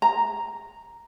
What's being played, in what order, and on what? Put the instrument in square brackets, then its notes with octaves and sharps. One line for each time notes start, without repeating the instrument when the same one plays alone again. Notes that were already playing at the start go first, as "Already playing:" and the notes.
[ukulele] A#5